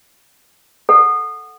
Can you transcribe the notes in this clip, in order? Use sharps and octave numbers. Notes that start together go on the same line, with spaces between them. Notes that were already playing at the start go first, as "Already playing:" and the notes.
A4 F#5